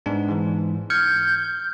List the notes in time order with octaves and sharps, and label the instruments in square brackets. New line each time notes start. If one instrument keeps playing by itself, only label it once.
[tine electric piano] G#2 B3 D4
G#2 E3
[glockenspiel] F6 [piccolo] G6 [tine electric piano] G#6 C#7